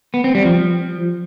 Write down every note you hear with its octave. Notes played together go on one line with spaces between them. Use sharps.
B3
C4
G3
F3